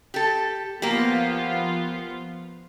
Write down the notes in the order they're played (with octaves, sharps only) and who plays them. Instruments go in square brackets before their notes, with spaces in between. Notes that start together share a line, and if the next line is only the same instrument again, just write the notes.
[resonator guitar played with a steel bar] G4 A4
[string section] F3 B3 F4 [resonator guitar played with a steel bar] A#3 G4